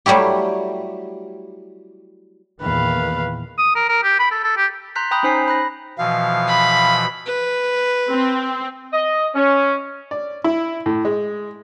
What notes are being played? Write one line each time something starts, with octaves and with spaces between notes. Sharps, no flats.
F#3 G3 A3 E4 G4
E2 A#2 D#3 B4 F5
D#6
A#4
A#4
G4
B5
A4
A4
G4
A#5 C6 F#6 G6 B6
G5 A#5 B5 D#6 F#6 G6
C#4 D#4 C5 G#5 B6 C7
B5 F#6 A#6
B2 E3 F3 F5
B5
B4
C4
D#5
C#4
D5
E4
A2
G#3